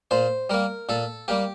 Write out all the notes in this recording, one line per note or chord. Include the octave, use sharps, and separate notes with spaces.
A#2 C5
G3 A#3 A#4
A#2 A4
G3 A#3 G4